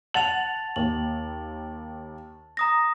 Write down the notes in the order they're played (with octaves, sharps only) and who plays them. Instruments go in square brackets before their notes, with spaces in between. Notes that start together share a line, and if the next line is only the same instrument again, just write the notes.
[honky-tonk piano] F#5 F#7 [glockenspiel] A5 A6 F7
[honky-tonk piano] D#2 [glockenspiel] F#7
[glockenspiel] A#5 D#6 A#6